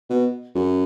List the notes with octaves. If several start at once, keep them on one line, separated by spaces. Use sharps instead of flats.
B2
F#2